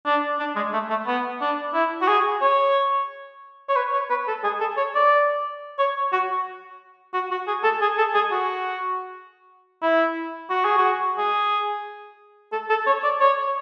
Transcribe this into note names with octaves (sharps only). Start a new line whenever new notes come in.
D4
D4
G#3
A3
A3
B3
D4
E4
F#4
G#4
C#5
C#5
B4
C#5
B4
A4
G#4
A4
C#5
D5
C#5
F#4
F#4
F#4
G#4
A4
G#4
A4
G#4
F#4
E4
F#4
G#4
F#4
G#4
A4
A4
C#5
D5
C#5